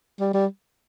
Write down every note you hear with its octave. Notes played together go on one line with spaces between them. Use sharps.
G3
G3